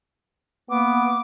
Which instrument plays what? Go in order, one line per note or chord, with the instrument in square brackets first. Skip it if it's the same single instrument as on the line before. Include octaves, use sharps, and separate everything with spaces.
[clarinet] A#3 [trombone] B3 [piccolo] D6